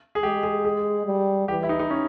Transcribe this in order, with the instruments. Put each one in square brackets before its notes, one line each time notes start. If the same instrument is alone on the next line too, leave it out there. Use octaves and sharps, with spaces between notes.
[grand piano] G#4
[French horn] G#3 [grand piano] G4
[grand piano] G#4
G#4
[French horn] G3
[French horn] E3 [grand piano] G4
[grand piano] E4
D#4
D#4
C#4